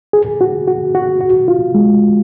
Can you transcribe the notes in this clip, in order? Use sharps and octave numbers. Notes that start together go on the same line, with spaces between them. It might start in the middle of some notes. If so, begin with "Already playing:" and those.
G#4
F#4
F#4
F#4
F#4
F4
G#3